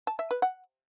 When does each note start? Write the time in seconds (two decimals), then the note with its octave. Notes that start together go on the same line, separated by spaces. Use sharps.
0.07 A5
0.19 E5
0.31 B4
0.42 F#5